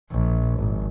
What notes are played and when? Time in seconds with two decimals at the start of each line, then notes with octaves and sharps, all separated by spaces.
0.11 A#1
0.59 G#1